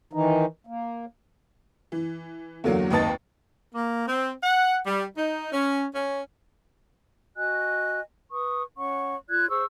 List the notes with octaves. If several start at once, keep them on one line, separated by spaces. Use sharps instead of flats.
D#3 E3 D#4
A#3
E3
E2 D3 F#3 A#3
G#1 D#2 B4 D#5 A5 A6
A#3
C4
F#5
G3
D#4
C#4
C#4
F#4 D#5 G#5 F#6
B4 C#6 D#6
C#4 C#5 F#5 C#6
F4 D5 F#6 G#6
G#4 C5 C#6 E6